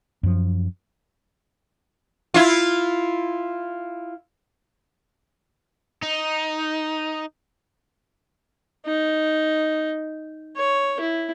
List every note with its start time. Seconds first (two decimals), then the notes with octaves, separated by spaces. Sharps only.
0.23 F#2 F3
2.34 E4 F4
6.02 D#4
8.86 D#4
10.57 C#5
11.00 E4